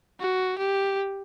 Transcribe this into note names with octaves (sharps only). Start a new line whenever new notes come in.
F#4
G4